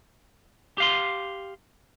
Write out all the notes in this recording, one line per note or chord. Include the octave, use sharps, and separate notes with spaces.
G4 F5 C6